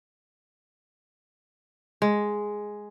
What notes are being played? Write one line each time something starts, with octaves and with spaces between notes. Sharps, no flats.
G#3